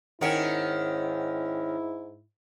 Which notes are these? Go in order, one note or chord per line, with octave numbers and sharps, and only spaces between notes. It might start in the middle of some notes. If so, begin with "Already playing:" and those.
G#2 D#3 C#4 E4 A#4 F#5 G5